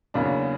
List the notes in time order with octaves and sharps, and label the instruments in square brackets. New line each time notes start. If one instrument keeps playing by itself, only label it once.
[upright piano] E2 C#3 F#3 A#3 D4